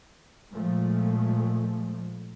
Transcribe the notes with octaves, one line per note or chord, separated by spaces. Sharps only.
A#2 F3 G#3 A3